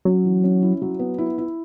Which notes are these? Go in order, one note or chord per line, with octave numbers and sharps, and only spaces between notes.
F#3 C#4
E3
C#4
E4
F#3
B3
E4
E4